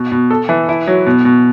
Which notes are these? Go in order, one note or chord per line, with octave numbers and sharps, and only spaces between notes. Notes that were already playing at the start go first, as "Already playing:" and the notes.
Already playing: B2
B2
A4
E3
E4
F#3
B2
B2